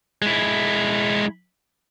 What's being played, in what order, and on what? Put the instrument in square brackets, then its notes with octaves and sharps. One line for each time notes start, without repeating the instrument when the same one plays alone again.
[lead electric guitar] G#3 E4